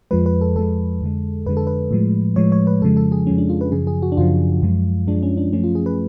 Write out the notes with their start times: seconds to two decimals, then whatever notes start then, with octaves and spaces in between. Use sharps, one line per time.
0.11 F2 F3 G#3 B4
0.26 B4
0.41 A4
0.56 F2 F3 G#3 A4
1.01 F2 D3 G#3
1.46 F2 D3 G#3 B4
1.57 A4
1.67 B4
1.91 A2 F3 G#3
2.36 A2 F3 G#3 C#5
2.52 C#5
2.67 B4
2.81 F2 C#3 F3 G#3 A4
2.97 A4
3.12 G#4
3.27 F2 C#3 F3 G#3 C#4
3.38 D4
3.49 F4
3.61 B4
3.72 F#2 C#3 F3 G#4
3.87 G#4
4.02 F#4
4.12 D4
4.17 F#2 C#3 F3 F4
4.62 F#2 F3 G#3
5.07 F#2 F3 G#3 D4
5.23 C#4
5.37 D4
5.53 F#2 F3 A3 C#4
5.64 F4
5.75 G#4
5.86 B4